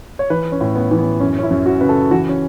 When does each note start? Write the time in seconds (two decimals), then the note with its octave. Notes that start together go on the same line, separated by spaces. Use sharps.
0.19 C#5
0.30 E3 B4
0.52 C#4
0.61 A2
0.76 B3
0.91 E3
0.98 B3
1.20 F#2 C#4
1.39 C#4
1.43 E4
1.50 F#2
1.66 F#4
1.81 C#3 B4
1.89 A4
2.11 E3 F#4
2.29 C#4